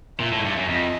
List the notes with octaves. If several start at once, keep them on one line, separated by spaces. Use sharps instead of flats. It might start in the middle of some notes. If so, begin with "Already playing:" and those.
A#2 E5
A2
G#2
G2
F#2
F2 D#5